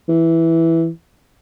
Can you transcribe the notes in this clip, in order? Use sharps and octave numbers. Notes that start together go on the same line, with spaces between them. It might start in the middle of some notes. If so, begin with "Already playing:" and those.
E3